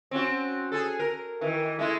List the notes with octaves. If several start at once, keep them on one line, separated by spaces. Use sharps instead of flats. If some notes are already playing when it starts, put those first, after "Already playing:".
C4 C#4 F#4
G#4 A4
A#4
D#3 E3
G#3 A3 E4